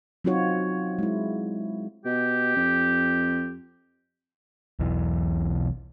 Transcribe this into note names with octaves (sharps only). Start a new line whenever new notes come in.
F#3 C4 D#4 F4 F#4 C#5
G#3 E4
B2 G4
F2
E1 B1 E2 E3